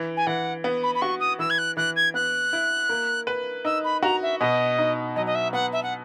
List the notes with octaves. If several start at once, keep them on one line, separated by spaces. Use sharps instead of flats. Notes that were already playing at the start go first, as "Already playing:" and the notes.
Already playing: E3
G#5
E3 F#5
B3
B5
B5
F#4 C#6
D#6
E3 E6
G#6
F#6
E3 F#6
G#6
B3 F#6
E4
A#3
B4
D#4 E6
B5
F#4 A#5
E5
B2 D#5
D#4
F#3 D#5
D#5
E5
B3 F#5
E5
F#5